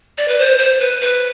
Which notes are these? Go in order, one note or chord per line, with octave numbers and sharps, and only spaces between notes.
D5
B4
C5
C5
B4
B4